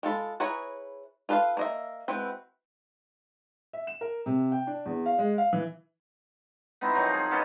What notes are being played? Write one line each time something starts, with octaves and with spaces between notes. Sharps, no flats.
G#3 F4 A4 B5
E4 G#4 B4 C#5 A#5
F4 A4 B4 E5 F5
A#3 D#5 E5
G#3 C4 E4 F#4 B4
E5
E7
A#4
C3
G5
D4
E2
F5
G#3
F5
E3
B3 C4 D#4 E4
D#3 F3 F#3 C4
G#4
B3 C#4 F4 A4